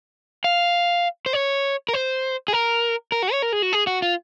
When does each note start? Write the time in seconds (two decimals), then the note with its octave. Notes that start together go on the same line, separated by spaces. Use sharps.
0.44 F5
1.26 C5
1.33 C#5
1.88 A#4
1.93 C5
2.48 G#4
2.53 A#4
3.12 A#4
3.22 F#4
3.32 C#5
3.42 A#4
3.53 G#4
3.62 F#4
3.73 G#4
3.87 F#4
4.02 F4